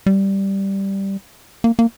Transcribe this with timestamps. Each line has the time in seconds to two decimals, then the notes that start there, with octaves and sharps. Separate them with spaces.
0.06 G3
1.64 A#3
1.79 A#3